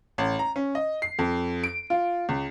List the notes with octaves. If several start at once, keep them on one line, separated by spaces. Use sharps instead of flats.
A1
A#5
C#4
D#5
C7
F2
D7
F4
C#2